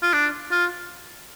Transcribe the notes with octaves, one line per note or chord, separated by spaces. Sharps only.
F4
D4
F4